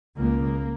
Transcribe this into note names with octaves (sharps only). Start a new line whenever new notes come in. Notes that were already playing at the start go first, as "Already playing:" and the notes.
C#2 C#3 A#3